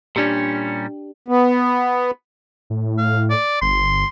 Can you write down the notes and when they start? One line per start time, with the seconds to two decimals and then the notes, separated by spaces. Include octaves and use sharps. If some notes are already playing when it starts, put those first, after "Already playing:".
0.16 A#2 G3 C#4 D4 G4
1.28 B3
2.70 A2
2.98 F5
3.30 D5
3.62 G1 C6